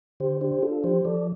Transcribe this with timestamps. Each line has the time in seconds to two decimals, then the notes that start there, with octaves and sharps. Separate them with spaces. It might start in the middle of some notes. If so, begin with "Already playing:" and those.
0.20 D3 G4 C5
0.41 D4 G4 C5
0.63 D4 F4 A4
0.84 F3 G4 C5
1.05 F3 A4 D5